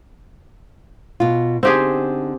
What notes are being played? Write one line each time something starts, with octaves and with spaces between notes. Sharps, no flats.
B2 F4
D3 C4 D#4 G4 G#4